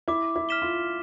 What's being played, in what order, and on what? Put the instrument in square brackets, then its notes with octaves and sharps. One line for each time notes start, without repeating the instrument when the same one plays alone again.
[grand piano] E4 [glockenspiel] D6
[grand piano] E4
[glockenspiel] F6 B6 E7 G7
[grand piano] F4